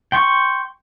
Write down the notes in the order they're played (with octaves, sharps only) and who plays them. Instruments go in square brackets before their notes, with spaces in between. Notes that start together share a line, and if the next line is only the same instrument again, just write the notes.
[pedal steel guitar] G5 C6 C#6